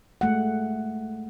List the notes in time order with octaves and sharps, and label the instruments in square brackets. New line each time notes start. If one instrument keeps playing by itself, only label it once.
[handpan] G#3 A3 F#5